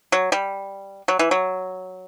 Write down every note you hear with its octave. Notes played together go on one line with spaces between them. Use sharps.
F#3
G3
F#3
E3
F#3